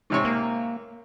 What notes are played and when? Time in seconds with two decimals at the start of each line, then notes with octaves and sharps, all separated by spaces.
0.10 G#2 C3 C#5
0.25 A#3